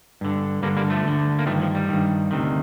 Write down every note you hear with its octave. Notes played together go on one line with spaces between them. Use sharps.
G2 D3
G2 D3 G3 A#3
G3 A#3
F3 A3
D2 D3
A#3
G2 D#3 F3 A3
F3
G3
G2 D#3
D2 C3 D#3